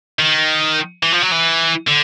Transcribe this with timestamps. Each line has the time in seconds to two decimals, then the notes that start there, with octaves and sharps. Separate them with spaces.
0.19 D#3
1.03 E3
1.13 F3
1.22 F#3
1.32 E3
1.88 D3